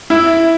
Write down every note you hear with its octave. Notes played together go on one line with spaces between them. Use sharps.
E4